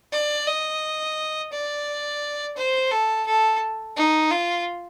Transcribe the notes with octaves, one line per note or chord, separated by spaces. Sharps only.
D5
D#5
D5
C5
A4
A4
D#4
F4